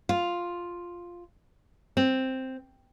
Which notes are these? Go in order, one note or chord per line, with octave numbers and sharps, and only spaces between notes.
F4
C4